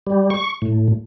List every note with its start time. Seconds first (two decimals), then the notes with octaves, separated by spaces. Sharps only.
0.07 G3
0.30 C#6
0.62 A2